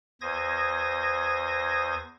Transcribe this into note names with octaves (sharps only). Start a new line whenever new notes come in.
E2 C5 D#6 G#6 A#6